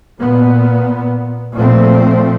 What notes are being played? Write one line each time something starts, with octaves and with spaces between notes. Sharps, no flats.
A#2 B3
A#2 F3 A3 C4